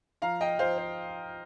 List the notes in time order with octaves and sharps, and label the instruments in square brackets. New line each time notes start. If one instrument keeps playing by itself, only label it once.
[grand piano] F3 F5 A#5
D#5 G5
F3 C5 F5
C5